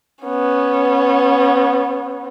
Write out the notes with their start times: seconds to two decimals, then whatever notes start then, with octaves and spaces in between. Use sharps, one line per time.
0.25 B3 C#4